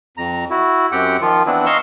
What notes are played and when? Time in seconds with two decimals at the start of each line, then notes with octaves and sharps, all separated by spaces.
0.17 F2 A#5
0.50 E4 F#4
0.92 F#2 C4 G4 F#5 G5
1.21 D#3 F3 F4
1.46 E3 B3 C4 D4 E4
1.66 D#5 F5 A#5 C6 C#6 E6